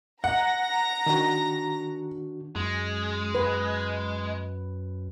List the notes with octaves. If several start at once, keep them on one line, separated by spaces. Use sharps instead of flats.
F#5 A#5 A#6
D#3 D4 F#4
F#2 G#3
B4